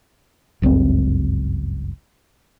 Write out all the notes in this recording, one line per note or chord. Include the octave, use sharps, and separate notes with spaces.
G1 C#2 F#2 C4